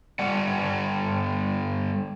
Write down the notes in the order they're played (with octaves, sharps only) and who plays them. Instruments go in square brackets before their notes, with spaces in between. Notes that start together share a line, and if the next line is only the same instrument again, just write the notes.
[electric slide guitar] D3 G3 D5 F#5